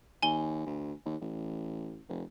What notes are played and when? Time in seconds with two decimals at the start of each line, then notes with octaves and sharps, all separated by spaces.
0.22 D#2 G#5 G7
0.66 D2
1.05 D#2
1.21 A1
2.09 F1